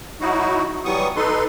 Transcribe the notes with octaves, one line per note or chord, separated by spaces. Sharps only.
F#3 D#4 E4 F#4
E3 F#3 G3 B3 C#6 D#6
D#4 A4 B4 C6